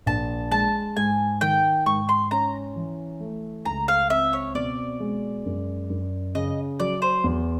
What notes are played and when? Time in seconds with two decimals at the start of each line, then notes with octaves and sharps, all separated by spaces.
0.06 A#1 A5
0.51 G#3 A5
0.97 G#2 G#5
1.41 D#3 G5
1.86 G#2 C#6
2.09 C6
2.31 C#4 A#5
2.76 E3
3.20 A3
3.65 C#2 A#5
3.88 F5
4.10 C4 E5
4.33 C#5
4.55 B2 D5
5.00 G#3
5.46 F#2
5.90 F#2
6.35 C#3 D#5
6.80 F#3 D5
7.02 C5
7.24 E2